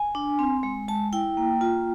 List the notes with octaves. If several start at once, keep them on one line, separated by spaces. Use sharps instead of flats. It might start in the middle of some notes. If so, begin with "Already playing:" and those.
Already playing: G#5
D4
C4
G#3
G#3 A5
E4 G5
A#3
F4